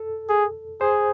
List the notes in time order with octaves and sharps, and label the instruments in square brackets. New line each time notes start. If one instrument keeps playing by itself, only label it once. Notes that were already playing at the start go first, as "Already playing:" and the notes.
Already playing: [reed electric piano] A4
[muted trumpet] G#4
[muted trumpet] G#4 [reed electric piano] C5